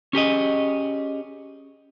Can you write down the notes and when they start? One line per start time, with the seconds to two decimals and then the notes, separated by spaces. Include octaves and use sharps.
0.13 C#4 G4 G#4 D#5